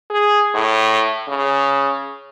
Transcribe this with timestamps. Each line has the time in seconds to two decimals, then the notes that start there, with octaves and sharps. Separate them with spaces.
0.10 G#4
0.55 A2
1.28 C#3